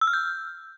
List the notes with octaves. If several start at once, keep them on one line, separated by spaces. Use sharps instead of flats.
E6
F6
G6